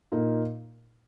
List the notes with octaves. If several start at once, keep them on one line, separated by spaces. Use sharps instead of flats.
A#2 A#3 D#4